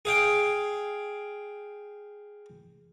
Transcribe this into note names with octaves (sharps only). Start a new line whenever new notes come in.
G#4 F5 G5